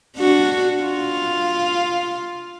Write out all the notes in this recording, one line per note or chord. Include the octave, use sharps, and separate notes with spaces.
D4 F#4
F4